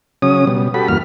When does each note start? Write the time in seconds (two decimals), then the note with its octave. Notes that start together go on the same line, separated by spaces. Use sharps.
0.22 C#3 F#3 C#4 D#6
0.47 B2 G3
0.74 F#4 G4 A4 B5
0.88 E2 G2 A#3 F#4 F6